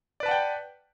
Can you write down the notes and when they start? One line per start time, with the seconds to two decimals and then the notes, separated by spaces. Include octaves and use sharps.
0.20 D5
0.23 B4
0.26 A5
0.28 F#5
0.31 G5